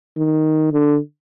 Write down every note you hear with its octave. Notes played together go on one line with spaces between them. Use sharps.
D#3
D3